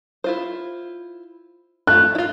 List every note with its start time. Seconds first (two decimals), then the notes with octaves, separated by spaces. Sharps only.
0.24 E4 F4 C5
1.87 A3 F4 F#6
2.15 E4 F4